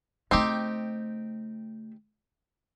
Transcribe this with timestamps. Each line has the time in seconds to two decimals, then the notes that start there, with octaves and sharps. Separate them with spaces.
0.31 C#3 A3 C4 D#4 G4